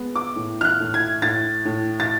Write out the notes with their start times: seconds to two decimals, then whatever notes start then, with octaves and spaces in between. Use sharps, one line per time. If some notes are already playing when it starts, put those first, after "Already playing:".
Already playing: G#3 B3
0.15 D6
0.36 A2
0.61 F6
0.65 F#6
0.80 A2
0.94 G#6
1.22 A2 A6
1.65 A2
2.00 A6